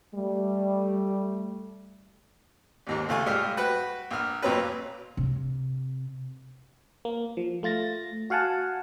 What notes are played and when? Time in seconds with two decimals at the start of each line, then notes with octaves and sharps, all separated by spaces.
0.15 G3 A3
2.87 A1 D#2 G#2
3.09 C#2 A3 F5 G#5
3.26 A2 G3 G#3 F4 F6
3.57 F#4 B4 G5
4.11 A#1 F6
4.42 F2 A#2 F#3 C4 C#4 B4
5.17 C3
7.05 A#3
7.37 F3
7.63 A3 F4 A6 A#6
8.30 F#4 F5 F#5 G#5 A5